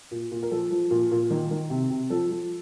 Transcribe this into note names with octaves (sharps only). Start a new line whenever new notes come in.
A#2
A#2
A#4
F3 A4
F3
A#2
A#2
D#3
D#3
C3
C3
F3 A4
F3